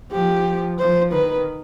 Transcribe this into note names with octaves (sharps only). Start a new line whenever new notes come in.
F3 G4
F3 C5
D#3 B4